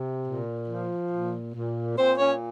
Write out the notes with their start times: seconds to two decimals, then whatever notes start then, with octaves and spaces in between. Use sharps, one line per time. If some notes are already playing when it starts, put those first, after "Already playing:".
Already playing: C3
0.27 A#2
0.69 F3
1.11 A#2
1.55 A#2
1.97 A#2 C4 C5
2.17 C#4 C#5